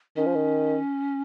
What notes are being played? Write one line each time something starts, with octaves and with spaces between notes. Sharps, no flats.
D#3 C#4
F3
D#3